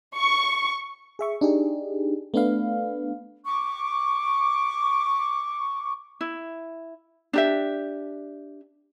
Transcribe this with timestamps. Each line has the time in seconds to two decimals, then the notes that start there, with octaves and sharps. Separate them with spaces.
0.17 C#6
1.19 G#4 E5 C#6
1.41 D4 D#4 G4 G#4
2.34 A3 B3 D4 B4 F5
3.45 C#6 D6
6.21 E4
7.33 D4 G4 E5